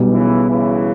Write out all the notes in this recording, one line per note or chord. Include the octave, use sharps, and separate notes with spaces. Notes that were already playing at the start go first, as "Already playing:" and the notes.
Already playing: B1 B2 G3
C#3 E3
C#3 E3